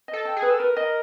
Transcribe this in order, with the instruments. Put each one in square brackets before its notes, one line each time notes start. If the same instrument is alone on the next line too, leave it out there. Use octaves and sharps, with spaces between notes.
[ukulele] D#5
[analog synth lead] A4
[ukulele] G5
[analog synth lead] G#4
[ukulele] B4
[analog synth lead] A4
[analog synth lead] A#4 [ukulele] B4
[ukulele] D#5